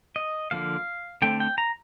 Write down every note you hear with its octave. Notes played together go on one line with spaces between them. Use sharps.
D#5
D3 F3 A#3 F5
D3 A3 C4 G5
G5
A#5